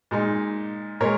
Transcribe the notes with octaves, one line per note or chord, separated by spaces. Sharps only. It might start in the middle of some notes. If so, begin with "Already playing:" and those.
A#2 G#3 D#4
A#2 G#3 A#4 C#5